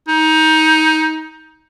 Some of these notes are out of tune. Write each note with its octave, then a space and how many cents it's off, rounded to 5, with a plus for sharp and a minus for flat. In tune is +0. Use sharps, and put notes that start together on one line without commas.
D#4 +20